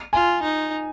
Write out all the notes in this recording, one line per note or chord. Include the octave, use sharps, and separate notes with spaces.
F4 G#5
D#4